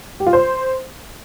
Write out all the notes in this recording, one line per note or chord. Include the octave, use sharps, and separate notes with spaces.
G4
F4
C5